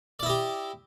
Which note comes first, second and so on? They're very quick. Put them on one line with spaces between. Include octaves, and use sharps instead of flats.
D5 E4 D#5 G4